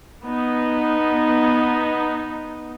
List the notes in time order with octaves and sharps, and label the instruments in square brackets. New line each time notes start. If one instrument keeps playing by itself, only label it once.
[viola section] B3 D#4